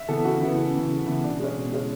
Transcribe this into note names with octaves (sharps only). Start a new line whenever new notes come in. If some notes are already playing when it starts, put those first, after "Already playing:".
Already playing: E5
E3 B3 A4
C#3 F#4
E3 B3 E4
C#3
E3 B3
C#3
E3 B3
B2 D4
G#3 C#4
B2
G#3 C#4